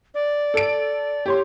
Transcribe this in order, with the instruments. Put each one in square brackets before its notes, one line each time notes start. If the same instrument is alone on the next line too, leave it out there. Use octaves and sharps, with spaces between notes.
[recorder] D5
[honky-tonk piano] A4 D7
G4 C#5 C6